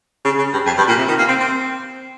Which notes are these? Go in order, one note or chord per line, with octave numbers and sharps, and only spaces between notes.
C#3
C#3
G2
F2
G2
A#2
C3
D#3
A#3
C4
C4